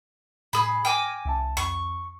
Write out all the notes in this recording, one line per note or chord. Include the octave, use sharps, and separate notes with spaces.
A2 G#4 B5
G5 G#5 D6 F6 A#6
C2 E5 A5
F2 C#6